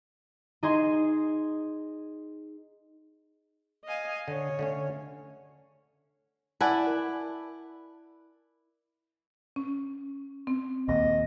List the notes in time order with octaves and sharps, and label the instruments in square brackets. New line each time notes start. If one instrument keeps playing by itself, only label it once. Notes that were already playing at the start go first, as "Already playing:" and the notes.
[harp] D#4 G#4 D#5 C6
[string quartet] D#5 F5 G#5
[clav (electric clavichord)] D3 D#5 [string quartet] C#5
[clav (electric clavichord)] D3 A3 C#4
[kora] E4 B4 D5 [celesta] F#5 G#5 A5
[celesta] A#4
[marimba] C#4
C4
[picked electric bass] A#1 D#2 A#2 [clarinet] D#5